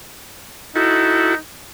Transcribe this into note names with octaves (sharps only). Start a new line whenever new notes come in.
D#4 E4 F#4 A4